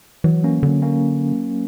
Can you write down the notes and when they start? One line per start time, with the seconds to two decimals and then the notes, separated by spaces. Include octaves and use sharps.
0.24 E3 F#3
0.44 A#3 C#4
0.63 D3 F#3
0.82 A#3 C#4